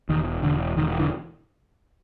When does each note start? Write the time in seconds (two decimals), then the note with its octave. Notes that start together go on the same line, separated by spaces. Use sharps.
0.09 E1 D#3
0.42 E1 D3
0.77 E1 D#3
0.99 D3 E3